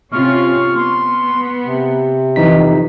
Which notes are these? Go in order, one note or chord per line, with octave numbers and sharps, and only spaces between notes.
C3 C#4 F4 C#6 F6
B3 C6
C3
F2 D3 E3 D#4 B6